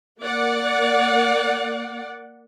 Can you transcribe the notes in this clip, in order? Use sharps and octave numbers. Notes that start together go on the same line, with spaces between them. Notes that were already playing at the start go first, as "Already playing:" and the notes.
A#3 D5 F#5